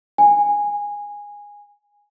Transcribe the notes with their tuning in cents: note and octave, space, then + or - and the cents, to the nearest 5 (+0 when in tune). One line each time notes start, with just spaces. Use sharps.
G#5 -15